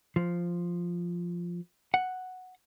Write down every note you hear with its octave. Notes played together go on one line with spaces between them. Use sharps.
F3
F#5